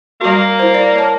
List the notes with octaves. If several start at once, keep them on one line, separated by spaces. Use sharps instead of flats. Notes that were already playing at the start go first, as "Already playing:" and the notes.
G3 A#3 F#4 A#4
E4 C5
D5
C#5 A5